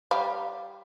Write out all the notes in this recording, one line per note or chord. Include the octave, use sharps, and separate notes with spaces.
G3 F5